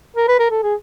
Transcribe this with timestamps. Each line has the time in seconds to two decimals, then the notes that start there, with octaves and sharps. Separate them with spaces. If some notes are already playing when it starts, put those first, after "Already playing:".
0.17 A#4
0.28 B4
0.39 A#4
0.51 A4
0.63 G#4